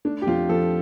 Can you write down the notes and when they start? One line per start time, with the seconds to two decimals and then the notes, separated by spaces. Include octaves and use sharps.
0.05 A3 D4
0.22 G4
0.27 F2 F4
0.49 F3 A4